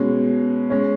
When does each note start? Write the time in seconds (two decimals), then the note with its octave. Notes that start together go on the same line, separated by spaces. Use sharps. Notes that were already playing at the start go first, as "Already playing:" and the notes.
Already playing: B2 G#3 C#4
0.70 G#3 C#4